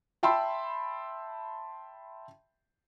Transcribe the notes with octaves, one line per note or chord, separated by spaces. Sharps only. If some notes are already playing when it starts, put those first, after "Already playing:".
E5 G5 A5 B5 C6 E6